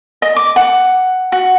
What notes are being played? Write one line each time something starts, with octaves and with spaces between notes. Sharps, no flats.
D#5
D6
F#5
F#4